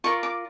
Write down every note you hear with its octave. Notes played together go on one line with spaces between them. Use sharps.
F4 A#4 D5 C#6
D6